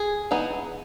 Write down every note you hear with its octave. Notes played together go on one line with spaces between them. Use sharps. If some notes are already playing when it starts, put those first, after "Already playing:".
Already playing: G#4
E3 B3 D#4